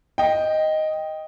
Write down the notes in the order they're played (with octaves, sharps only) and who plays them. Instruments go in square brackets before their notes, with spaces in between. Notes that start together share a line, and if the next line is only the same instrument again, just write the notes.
[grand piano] D#5 G5